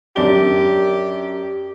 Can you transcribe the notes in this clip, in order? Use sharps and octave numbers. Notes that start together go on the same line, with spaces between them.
F#2 D4 G4 G7